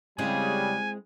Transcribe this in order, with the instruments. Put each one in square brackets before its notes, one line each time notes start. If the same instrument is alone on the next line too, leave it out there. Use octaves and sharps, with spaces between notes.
[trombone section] C#3 G3 [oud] G#3 C4 E4 [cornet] G#5